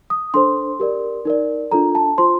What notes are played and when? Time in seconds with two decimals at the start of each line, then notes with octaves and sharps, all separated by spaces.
0.10 D#6
0.34 D4 A4 C5 C6
0.80 G4 A#4 D5
1.25 D#4 A#4 D5
1.71 D4 F4 A4 A#5
1.95 A5
2.18 F4 C5 C6